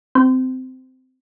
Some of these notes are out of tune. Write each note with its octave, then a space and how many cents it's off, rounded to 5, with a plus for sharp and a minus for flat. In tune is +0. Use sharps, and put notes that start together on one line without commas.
C4 -20